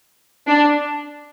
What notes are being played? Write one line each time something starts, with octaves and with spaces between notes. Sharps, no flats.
D4